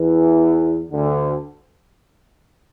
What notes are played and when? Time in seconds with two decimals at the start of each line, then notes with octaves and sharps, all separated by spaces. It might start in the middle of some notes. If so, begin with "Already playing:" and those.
Already playing: E2 E3
0.91 D2 D3